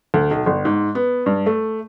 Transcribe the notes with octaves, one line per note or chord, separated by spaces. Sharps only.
D2
B1
G1
G#2
B3
G2
A3